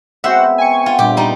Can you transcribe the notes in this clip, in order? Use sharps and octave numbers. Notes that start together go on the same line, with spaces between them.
G#3 B3 C4 F#4 C5 E5 F#5
G5 G#5 C#6
F4 E5 F#5
G2 A#2 G4
G3 D#4 A#5